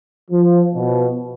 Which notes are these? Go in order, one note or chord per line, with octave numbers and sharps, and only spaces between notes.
F3
B2